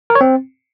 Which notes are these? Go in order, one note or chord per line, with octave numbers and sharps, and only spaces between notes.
A#4
C#5
C4